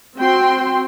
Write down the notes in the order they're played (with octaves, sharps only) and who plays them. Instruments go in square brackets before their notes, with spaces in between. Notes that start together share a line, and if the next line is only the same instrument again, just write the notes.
[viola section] C4 F#4 G5 C6